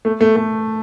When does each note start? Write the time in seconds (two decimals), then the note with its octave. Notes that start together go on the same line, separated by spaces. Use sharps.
0.05 A3
0.21 A3
0.36 A3